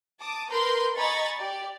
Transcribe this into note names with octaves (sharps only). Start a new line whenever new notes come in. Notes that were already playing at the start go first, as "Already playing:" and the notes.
A5 D6 D#6
A#4 B4 A#5 C6 G6
D#5 G#5 A#5 B5 C#6 A6
G4 D5